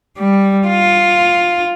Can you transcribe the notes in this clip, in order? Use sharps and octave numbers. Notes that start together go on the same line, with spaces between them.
G3
F4